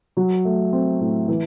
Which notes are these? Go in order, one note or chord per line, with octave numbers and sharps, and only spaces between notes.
F#3
A3
C4
A2
E3